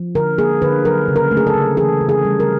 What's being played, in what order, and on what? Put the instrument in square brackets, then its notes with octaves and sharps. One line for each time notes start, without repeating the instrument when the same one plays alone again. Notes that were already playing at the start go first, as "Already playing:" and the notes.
Already playing: [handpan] F3
D3 A#4
A#3 G#4
D3 B4
F#3 A#4
C#3
A#4
A3
G#4
A4
C#3
E3 G#4
C#3
G#4
G3
A#4